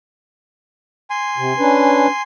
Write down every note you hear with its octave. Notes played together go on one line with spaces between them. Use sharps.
G#5 C6
C3
C#4 D4 B4